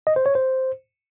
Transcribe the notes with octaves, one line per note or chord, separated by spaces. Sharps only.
D#5
C5
C#5
C5